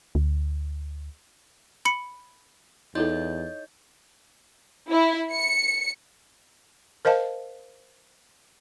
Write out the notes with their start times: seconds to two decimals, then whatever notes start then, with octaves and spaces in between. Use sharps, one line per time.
0.15 D2
1.85 B5 C#7
2.95 E2 D#4 E4 A4 C#5 D#5 G6
4.89 E4
5.31 C#7
7.05 A#4 C5 D#5 F5 A5